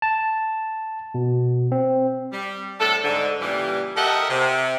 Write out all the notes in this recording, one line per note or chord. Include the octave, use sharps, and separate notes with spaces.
A5
B2
C4
G3
A2 C3 D4 A4
G#2 D3
A#2 C#3 E3 G3
G4 A4 A#4 D#5 E5 F#5
C3